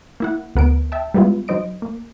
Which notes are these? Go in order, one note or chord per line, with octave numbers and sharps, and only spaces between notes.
A#3 E4 F#5
D2 B3 A#4 D7
E5 G5 A5
G3 G#3 B3 E4 F4
F#3 D#4 C5 D#5 D7
A#3